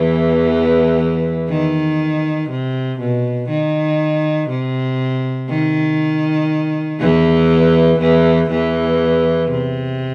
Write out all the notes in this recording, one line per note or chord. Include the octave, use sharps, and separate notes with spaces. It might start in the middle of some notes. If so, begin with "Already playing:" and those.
Already playing: E2 E3
D#3
C3
B2
D#3
C3
D#3
E2 E3
E2 E3
E2 E3
C3